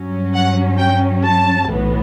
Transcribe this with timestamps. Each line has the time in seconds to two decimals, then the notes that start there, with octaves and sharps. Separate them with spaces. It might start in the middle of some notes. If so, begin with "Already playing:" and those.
Already playing: G2 F#3 C#4
0.34 F#5
0.78 G5
1.24 A5
1.69 B1 A2 E3 B3